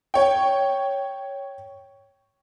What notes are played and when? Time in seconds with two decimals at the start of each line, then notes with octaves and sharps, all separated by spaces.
0.14 C#5 G5